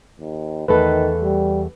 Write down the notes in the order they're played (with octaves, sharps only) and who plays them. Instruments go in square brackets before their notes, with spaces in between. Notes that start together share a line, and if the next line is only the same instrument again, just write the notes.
[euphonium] D#2
[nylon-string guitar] E2 A3 A4 [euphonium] D#3 [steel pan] B4
[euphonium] G3